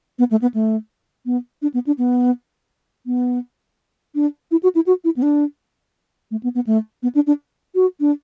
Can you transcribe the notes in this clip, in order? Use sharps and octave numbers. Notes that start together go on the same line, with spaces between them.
B3
A3
B3
A3
B3
D4
B3
D4
B3
B3
D4
E4
F#4
E4
F#4
E4
B3
D4
A3
B3
B3
A3
B3
D4
D4
F#4
D4